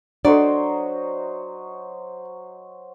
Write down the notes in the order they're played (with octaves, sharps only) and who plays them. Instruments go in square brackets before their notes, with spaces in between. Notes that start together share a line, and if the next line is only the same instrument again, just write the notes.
[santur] F#3 C5 D#5 [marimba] D4 A4 [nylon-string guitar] D5